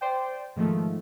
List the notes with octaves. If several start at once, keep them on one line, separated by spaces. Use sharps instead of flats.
C5 D5 G5
G#2 D#3 F3 A3